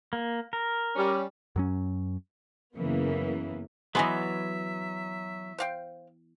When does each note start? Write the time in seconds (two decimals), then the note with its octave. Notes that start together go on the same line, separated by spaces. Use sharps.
0.13 A#3
0.53 A#4
0.96 G3 C#4
1.56 F#2 F#3 C#4
2.76 F#2 C#3 E3 A#3 B3
3.95 E3 F#3 B3 D#5 E5 G#5 C6
5.58 C5 F5 G5